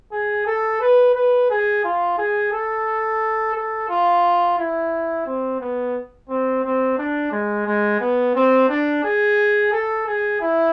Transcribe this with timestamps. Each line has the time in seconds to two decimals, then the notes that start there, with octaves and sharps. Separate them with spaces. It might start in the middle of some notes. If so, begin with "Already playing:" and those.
0.12 G#4
0.47 A4
0.81 B4
1.15 B4
1.50 G#4
1.84 F4
2.18 G#4
2.52 A4
3.55 A4
3.89 F4
4.58 E4
5.26 C4
5.60 B3
6.29 C4
6.64 C4
6.98 D4
7.32 G#3
7.67 G#3
8.00 B3
8.35 C4
8.69 D4
9.04 G#4
9.72 A4
10.06 G#4
10.41 E4